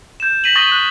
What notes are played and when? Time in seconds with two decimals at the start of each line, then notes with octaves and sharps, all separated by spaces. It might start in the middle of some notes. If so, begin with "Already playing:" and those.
0.20 G6 E7
0.44 A#6 B6 D#7 F#7
0.55 C#6 D#6 A6 A#6 D#7 G7
0.72 F#6